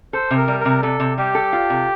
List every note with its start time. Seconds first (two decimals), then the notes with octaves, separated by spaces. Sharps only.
0.13 A4 C5
0.31 C3
0.37 A#4
0.48 G3
0.60 A#4
0.65 C3
0.82 C3 A4
1.00 C3
1.18 G3 G4
1.35 A4
1.53 F4
1.70 C3